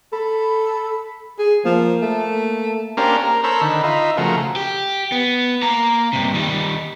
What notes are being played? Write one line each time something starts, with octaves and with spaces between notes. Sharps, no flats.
A4 B5
G#4
F3 A#3
A3
A#3 C#4 D4 G4 A#4 C5
A#4
A4 A#4 C5 C#5 B5 E6
D3 D#3 B5
D#4 F4 E5
C#3 F3 A3 F#4 A#4
G4
B3
A#3 A#5
G2 C3
D#3 G3